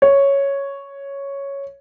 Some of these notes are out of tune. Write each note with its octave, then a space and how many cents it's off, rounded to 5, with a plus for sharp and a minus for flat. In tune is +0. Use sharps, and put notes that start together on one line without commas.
C#5 +0